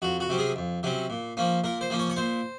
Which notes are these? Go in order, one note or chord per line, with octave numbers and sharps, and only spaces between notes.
F2 F#4
F#4
C3 F#3 C#4
G#4
F2
C3 F#3 C#4
A#2
F3 A#3 C#4
A#2 A#4
C5
F3 A#3 C#4
C#5
C#5
A#2 C5